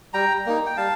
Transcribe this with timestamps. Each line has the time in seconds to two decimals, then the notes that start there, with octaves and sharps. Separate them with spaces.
0.13 G3 G5 A#5
0.46 A#3 D#4
0.66 G5
0.77 G3 F5 A5